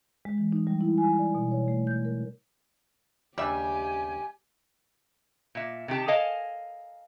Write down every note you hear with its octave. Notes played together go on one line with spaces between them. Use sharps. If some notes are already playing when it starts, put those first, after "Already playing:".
G#3
E3
D#4
G3
E4
G#5
D5
B2
C#5
A3
G6
A#4
D#2 C#3 G3 D4 G4 E5 G#5
A#2 E5
C3 D#3 G4 A5
A4 A#4 D#5 F5 G#5 A5